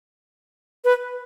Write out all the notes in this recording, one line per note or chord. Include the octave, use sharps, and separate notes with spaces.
B4